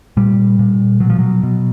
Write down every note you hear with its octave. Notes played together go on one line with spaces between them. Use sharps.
A#2 G3
A#2
B2 F#3
F3
F#3
B2